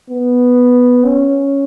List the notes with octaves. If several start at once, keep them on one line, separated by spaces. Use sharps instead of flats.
B3
C#4